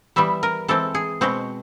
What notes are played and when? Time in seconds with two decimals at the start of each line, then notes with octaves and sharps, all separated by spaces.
0.16 E3 G3 B3 E5
0.43 A#4
0.68 E3 G#3 C4 A4
0.95 G#4
1.21 B2 G#3 C4 F#4